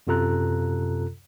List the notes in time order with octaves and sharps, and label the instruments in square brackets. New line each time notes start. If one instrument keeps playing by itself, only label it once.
[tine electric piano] F#2 C3 F4 A4 A#5 F#6